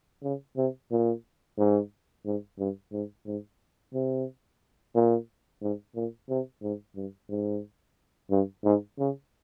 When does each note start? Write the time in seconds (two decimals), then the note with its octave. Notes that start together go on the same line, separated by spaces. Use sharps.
0.23 C#3
0.57 C3
0.91 A#2
1.58 G#2
2.26 G#2
2.59 G2
2.92 G#2
3.27 G#2
3.94 C3
4.95 A#2
5.62 G#2
5.96 A#2
6.30 C3
6.62 G#2
6.96 G2
7.30 G#2
8.31 G2
8.65 G#2
8.99 C#3